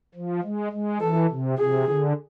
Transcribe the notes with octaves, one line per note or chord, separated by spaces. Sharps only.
F3
G#3
G#3
E3 A4
C3
C3 G#4
D3